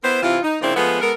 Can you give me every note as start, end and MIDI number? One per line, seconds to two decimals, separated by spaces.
0.03 0.21 59
0.03 0.21 64
0.03 0.21 70
0.03 0.21 72
0.22 0.38 48
0.22 0.38 52
0.22 0.38 60
0.22 0.38 64
0.22 0.38 65
0.43 0.59 63
0.61 0.72 49
0.61 0.72 53
0.61 0.72 58
0.61 0.72 60
0.61 0.72 62
0.61 0.72 64
0.75 0.98 53
0.75 0.98 56
0.75 0.98 57
0.75 0.98 59
1.01 1.12 56
1.01 1.12 59
1.01 1.12 69
1.01 1.12 70